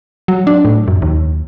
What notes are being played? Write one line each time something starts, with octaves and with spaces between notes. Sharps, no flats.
F#3
D4
A2
F#2
D#2